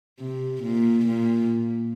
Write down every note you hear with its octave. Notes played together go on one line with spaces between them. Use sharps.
C3
A#2
A#2